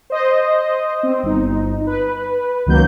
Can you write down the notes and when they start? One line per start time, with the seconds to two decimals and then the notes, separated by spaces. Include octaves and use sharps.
0.10 C5 D#5
1.03 C4
1.23 G1 D#4
1.87 B4
2.66 C#2 D#3 F#3 A#3 G6